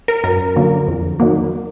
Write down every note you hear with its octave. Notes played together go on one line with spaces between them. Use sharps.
A#4
F#2 A#4
D3 F#3 A#3
F2
D#3 F#3 A#3